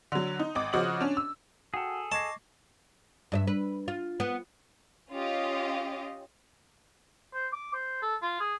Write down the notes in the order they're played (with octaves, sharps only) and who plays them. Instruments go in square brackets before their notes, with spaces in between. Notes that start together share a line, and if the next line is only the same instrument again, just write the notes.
[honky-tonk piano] D3 F#3
D#4
G#1 D#5 D6
C#3 F3 F#4 D#5 F#7
C#4 D4
E6
[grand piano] F#4 G5 [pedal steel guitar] G#4 A4
[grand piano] D#5 G#6 C7 [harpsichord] A5 [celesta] C#6 D6 A#6
[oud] G2 D#5 E5
B4
F4
B3
[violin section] C#4 F4 G4 C#5 D#5 F5
[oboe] C5
D6
C5
A4
F4
G#4